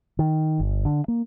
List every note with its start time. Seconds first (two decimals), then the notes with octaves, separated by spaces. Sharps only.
0.19 D#3
0.60 G1
0.85 D3
1.08 A#3